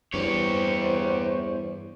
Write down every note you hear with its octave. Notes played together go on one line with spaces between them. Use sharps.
E2 G2 G4 C5 C#5